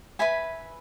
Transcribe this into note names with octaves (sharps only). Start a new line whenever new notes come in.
B4 E5 G#5 B5